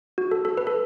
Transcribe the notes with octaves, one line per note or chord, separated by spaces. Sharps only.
F#4
A4
A4
B4
A4